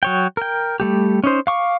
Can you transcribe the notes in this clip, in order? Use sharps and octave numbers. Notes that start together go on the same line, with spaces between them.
F#3 C#5 G5
A#4 G5
G3 A3 G4
C#4 D#4 C5
F5 C#6 D6